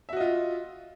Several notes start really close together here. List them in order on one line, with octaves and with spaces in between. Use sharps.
E5 F#4 D#5 F4